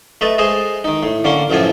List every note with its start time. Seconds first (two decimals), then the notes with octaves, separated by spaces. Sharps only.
0.21 A3 B4 D#5 A5
0.38 G#3 G#4 C5 D#5
0.84 D#3 D#4
1.03 A2
1.24 D3 A#3 C#4 C6
1.50 A1 F#2 A2 F3 F4 G#5